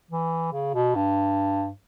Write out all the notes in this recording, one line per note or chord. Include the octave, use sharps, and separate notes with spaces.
E3
C#3
B2
G2